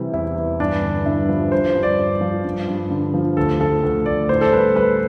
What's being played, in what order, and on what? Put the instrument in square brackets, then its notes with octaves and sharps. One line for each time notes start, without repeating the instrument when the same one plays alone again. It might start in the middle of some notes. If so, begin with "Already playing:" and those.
Already playing: [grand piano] C3 E3 G3 E4
E2 E4
E3
G2 D4
D3
G2 E4
F3
G2 C5
G2
D5
G2
F3
G2
G2
D3
F3
D2 A4
F3 A4
D2
D2 D5
A2 C5
A4
G3 B4
G3 B4